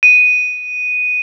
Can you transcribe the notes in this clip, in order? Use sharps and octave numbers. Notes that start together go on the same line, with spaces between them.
D#7